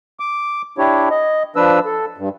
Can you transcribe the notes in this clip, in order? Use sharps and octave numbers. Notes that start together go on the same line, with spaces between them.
D6
D4 E4 G4 C#5
D#5
F3 D4 B4 E6
A4
G2